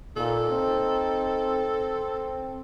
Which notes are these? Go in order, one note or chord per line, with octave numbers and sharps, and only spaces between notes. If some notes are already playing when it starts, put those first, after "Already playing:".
A#2 D#4 A4
C4